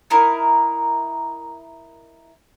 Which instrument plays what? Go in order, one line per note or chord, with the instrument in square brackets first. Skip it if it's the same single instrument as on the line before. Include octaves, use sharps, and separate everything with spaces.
[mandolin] D#4 E4 A#4